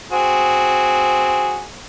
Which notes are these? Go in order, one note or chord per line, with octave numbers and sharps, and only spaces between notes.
C4 F#4 G#4